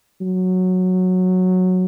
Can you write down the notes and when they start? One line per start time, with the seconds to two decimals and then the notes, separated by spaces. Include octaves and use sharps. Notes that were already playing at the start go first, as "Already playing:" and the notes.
0.21 F#3